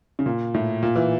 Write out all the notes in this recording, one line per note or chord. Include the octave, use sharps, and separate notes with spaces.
C#3
A#2
A2
A#2
E3